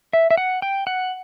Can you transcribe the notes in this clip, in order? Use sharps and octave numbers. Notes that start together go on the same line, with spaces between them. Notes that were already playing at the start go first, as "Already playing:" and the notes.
E5
E5
F#5
G5
F#5